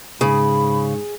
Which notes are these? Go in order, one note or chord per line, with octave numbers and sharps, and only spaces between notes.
G#2 C#3 G#4 B5